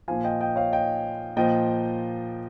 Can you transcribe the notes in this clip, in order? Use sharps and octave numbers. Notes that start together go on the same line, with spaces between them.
A#2 F3 F5 G#5
D#5 G5
D#5 G5
C#5 F5
D#5 G5
A#2 F3 D#5 G5